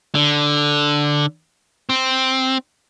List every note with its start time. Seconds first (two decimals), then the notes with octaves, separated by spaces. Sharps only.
0.15 D3
1.89 C4